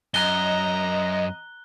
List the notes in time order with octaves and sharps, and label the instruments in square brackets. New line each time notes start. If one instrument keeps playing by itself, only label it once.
[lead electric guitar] F#2 [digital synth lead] D#5 [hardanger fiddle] A#5 [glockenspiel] F#6 G7